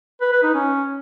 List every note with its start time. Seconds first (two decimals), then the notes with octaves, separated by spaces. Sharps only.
0.21 B4
0.32 B4
0.43 D#4
0.54 C#4